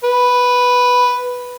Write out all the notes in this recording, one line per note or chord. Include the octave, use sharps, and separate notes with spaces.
B4